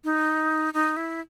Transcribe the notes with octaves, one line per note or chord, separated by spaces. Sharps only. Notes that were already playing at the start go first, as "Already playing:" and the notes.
D#4
D#4
E4